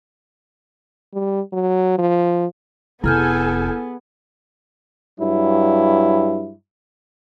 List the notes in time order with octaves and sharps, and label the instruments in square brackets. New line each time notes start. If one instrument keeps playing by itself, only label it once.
[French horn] G3
F#3
F3
[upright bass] F1 [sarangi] B3 [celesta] E4 F6 G6 [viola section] G#4 A4 G#5
[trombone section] G2 F#3 E4